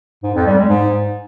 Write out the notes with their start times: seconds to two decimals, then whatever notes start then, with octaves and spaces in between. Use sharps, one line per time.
0.23 G#2
0.35 F2
0.46 G3
0.58 G#3
0.69 G#2